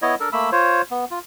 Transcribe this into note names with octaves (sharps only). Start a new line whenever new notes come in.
B3 E4 C#5 D#5
D4 A4 A#4
A3 A#3 B5 E6
F4 C5 C#5
B3
F4